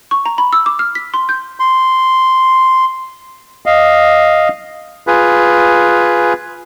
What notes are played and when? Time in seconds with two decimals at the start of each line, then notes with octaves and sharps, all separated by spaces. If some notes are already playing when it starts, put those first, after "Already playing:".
0.11 C#6
0.26 A#5
0.38 B5
0.53 E6
0.66 D6
0.79 F6
0.95 B6
1.14 C6
1.29 G6
1.60 C6
3.66 D#5 F5
5.07 F4 G#4 B4